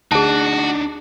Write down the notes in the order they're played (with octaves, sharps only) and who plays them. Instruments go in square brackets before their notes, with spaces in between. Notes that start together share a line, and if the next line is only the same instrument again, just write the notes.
[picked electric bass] D2 [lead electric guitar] D4 D#4 [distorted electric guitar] F#4 [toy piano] G#4 A5